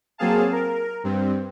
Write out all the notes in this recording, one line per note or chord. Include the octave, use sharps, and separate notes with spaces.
F#3 A#3 C4 G#4 F5 A5
A#4
G2 C4